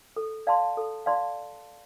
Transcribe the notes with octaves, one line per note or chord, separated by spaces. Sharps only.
A4
D5 F5 A5 C6
A4
D5 F5 A5 C6